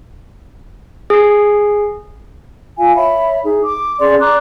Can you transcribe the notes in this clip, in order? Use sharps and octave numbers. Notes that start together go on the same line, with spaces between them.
G#4 C7
F4 F5 G#5
C#5 E5 B5
D#4 G#4
D6
C#4 G#4 D5 C6
D5 A#5 D6 F#6